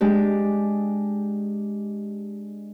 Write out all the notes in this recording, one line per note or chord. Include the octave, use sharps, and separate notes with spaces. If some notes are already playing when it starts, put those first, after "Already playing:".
G#3 D4 G4